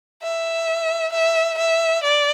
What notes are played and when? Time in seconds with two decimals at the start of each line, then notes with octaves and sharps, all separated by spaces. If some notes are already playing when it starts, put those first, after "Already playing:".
0.23 E5
1.13 E5
1.58 E5
2.03 D5